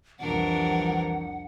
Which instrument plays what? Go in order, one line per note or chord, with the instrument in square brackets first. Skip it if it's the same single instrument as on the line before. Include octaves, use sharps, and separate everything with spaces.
[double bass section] C2 F2 [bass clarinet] E3 [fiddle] D4 A#4 [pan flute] F#5